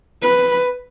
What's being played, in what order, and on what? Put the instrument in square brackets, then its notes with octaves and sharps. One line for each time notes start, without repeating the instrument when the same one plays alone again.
[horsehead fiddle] B4